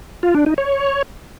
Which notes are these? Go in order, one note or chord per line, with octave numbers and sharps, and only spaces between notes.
F4
D4
D#4
C#5